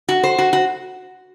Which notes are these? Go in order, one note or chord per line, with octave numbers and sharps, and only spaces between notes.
F#4
C5
F#4
F#4